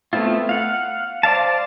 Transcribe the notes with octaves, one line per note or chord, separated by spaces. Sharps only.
A3 B3 C4 E4 F4
F5 F#5
C5 D5 F5 A5